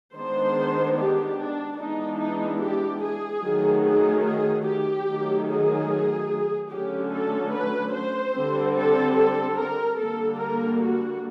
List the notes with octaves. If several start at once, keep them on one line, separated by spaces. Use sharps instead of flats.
D#3 G#3 B3 D4 C5
G4
D4
E3 G#3 B3 D4 D#4
D#4
G4
G#4
D#3 F#3 A3
G#4
G#4
G4
D#3 F#3 A3
G#4
D3 F#3 A3 C#4 G4
A4
B4
C5
D3 G3 C4
A4
A4
A#4
D3 G3 A#3 A4
A#4
F#4